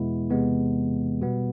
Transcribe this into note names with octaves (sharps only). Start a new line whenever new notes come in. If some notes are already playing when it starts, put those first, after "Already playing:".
Already playing: E2 B2 G#3 B3 E4
E2 C3 E3 G#3 B3
B2 G3 B3